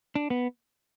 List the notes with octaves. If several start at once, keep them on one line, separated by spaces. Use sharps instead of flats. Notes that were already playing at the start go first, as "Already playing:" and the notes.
D4
B3